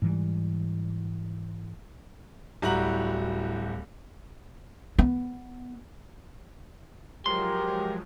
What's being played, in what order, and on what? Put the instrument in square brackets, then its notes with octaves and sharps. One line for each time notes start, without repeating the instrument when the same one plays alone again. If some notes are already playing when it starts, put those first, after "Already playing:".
[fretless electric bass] G#2 E3 G3
[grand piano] D1 G3 E4 F#4 A#5 F#7
[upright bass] B3
[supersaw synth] F3 F#3 G#3 [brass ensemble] G4 A#4 [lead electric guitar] C6